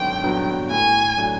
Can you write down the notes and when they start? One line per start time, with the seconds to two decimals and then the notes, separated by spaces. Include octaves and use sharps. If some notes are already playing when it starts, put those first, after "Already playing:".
Already playing: G#1 G2 D3 F#3 B3 G5
0.23 G2 D3 F#3 B3
0.70 A2 G#5
1.17 F#3 A3 D4